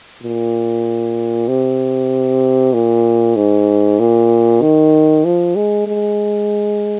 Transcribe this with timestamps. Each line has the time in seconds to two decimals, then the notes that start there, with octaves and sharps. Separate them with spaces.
0.23 A#2
1.48 C3
2.74 A#2
3.36 G#2
3.99 A#2
4.62 D#3
5.24 F3
5.56 G#3
5.87 G#3